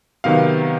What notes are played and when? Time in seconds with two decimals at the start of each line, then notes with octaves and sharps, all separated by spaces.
0.24 C3 D#3 F#3 B3 F5